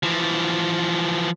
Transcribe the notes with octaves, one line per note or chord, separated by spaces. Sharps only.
E3 F3